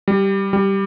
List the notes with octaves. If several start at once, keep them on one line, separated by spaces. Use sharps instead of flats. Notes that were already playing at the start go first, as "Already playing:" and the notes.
G3
G3